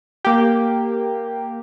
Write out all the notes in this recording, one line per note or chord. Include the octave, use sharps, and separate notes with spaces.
A#3 G4